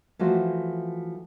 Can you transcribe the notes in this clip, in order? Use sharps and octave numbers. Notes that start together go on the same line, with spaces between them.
E3 F3 A3 F#4 C5